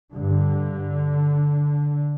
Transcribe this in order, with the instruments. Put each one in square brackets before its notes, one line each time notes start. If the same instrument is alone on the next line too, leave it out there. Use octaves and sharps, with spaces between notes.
[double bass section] G2 D3